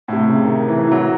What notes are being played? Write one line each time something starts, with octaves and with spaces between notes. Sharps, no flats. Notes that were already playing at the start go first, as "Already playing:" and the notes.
A2
C3
C#3
D#3
E3
E3
F#3